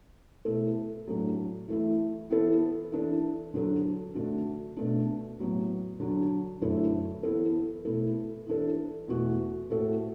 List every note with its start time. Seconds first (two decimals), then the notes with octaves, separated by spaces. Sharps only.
0.45 B2 A3 E4 A4
1.07 A2 F#3 D4 A4
1.68 E3 A3 E4
2.30 E3 B3 E4 A4
2.92 E3 D4 A4
3.54 D3 F#3 D4 F#4 A4
4.15 D3 A3 D4 F#4
4.77 B2 A3 D4
5.39 A2 F#3 B3
6.00 D3 F#3 D4
6.62 F#2 D3 A3 E4 A4
7.23 E3 B3 E4 A4
7.85 B2 A3 E4 A4
8.47 E3 D4 A4
9.08 E2 B2 A3 F#4
9.70 A2 A3 F#4 A4